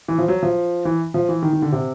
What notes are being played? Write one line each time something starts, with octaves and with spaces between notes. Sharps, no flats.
E3
F3
F#3
F3
E3
F3
E3
D#3
D#3
D3
C3